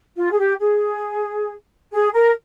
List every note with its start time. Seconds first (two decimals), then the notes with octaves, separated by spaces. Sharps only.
0.15 F4
0.31 G#4
0.37 G4
0.59 G#4
1.92 G#4
2.13 A#4